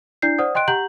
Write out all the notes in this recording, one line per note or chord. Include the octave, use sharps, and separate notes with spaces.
D4 E4 D5 G6 C7
C5 D5 F#5 D#6
D#5 G5 C6 F#6 D7
G4 F#5 A#5 G6 F#7